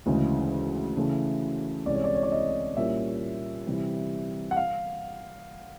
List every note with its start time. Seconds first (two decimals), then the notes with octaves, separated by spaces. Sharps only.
0.06 D2 C#3 E3 G#3
0.97 C#3 E3 A3
1.86 C2 C3 E3 G#3 C#4 D5
1.95 C#5
2.04 D5
2.15 C#5
2.23 D5
2.32 D#5
2.77 A#2 G3 A#3 C#4 E4 E5
3.67 C3 E3 G3
4.51 F#5
4.57 F5